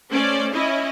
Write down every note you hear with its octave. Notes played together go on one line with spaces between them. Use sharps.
A3 C#4 C5 D5
C#4 E4 D#5